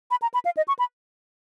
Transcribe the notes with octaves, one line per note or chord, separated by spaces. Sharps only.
B5
A#5
B5
F5
D#5
C#6
B5